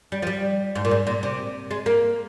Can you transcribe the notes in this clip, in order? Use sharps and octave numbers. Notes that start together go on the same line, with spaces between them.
G3
F3
G3
G#2
A#2
G#2
A#2
C3
G#3
A#3